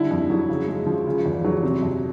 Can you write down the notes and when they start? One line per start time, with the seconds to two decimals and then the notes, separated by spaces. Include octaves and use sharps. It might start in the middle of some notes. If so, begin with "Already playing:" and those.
Already playing: D3 G3 E4
0.11 F2
0.30 F#3
0.50 C#3
0.68 G#3
0.86 F3
1.06 C#3
1.26 E2
1.44 F#3
1.63 C3
1.83 F2